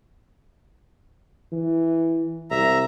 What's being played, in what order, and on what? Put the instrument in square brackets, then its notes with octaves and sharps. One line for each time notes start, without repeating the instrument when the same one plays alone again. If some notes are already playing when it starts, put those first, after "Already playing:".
[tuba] E3
[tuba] C2 [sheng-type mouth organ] E5 A#5